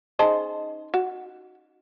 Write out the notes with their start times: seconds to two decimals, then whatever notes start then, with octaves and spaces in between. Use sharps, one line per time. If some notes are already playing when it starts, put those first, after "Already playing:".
0.19 C#4 D#4 G#4 C5 D#5 A5
0.94 F#4